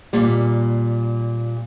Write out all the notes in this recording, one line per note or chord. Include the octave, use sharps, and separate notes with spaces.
A#2 G3